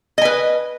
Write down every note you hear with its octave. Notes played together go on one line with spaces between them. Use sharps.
B4 D#5 G#5